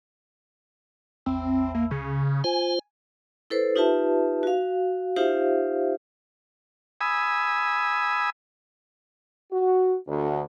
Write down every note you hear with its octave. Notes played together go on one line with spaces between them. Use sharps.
A1 E2 C4
A#3
C#2 C#3
F4 C5 G#5
E4 A4 B4 C5
D#4 F4 G4 B4 E5 A5
F#4 F5
D#4 F4 G4 C5 E5 F5
G#5 B5 D#6 E6
F#4
D2